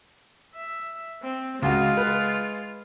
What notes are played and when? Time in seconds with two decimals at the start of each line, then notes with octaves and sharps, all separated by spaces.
0.55 E5
1.23 C4
1.62 C#2 G#3 F4 F#4
1.97 B4